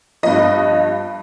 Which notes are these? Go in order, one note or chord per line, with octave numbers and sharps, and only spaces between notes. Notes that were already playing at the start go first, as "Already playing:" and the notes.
G2 F3 D#5